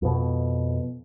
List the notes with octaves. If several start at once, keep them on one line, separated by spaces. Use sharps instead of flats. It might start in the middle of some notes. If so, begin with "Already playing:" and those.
F2 B2